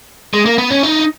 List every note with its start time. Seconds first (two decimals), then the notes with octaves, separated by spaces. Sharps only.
0.34 G#3
0.46 A#3
0.58 B3
0.70 C#4
0.83 D#4